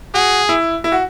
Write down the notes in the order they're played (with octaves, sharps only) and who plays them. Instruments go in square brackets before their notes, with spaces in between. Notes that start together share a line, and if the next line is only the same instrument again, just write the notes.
[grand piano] F#4 [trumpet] G#4
[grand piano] E4
E4
F#4